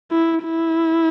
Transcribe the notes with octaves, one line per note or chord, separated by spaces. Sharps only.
E4
E4